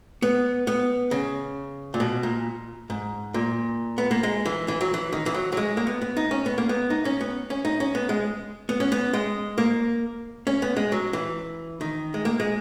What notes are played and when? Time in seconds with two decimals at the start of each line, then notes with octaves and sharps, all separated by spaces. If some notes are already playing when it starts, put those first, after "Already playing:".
0.22 B3
0.67 B3
1.11 C#3
1.94 A#2
2.00 B2
2.23 A#2
2.90 G#2
3.34 A#2
3.98 B3
4.11 A#3
4.23 G#3
4.46 E3
4.68 E3
4.81 F#3
4.94 E3
5.13 D#3
5.26 E3
5.34 F#3
5.52 F#3
5.57 G#3
5.77 A#3
5.87 B3
6.02 B3
6.17 D#4
6.31 C#4
6.46 B3
6.58 A#3
6.69 B3
6.90 D#4
7.05 C#4
7.21 B3
7.50 C#4
7.65 D#4
7.80 C#4
7.95 B3
8.09 G#3
8.69 B3
8.80 C#4
8.92 B3
9.13 G#3
9.58 A#3
10.47 C#4
10.62 B3
10.77 G#3
10.92 F#3
11.13 E3
11.81 D#3
12.14 G#3
12.25 A#3
12.40 G#3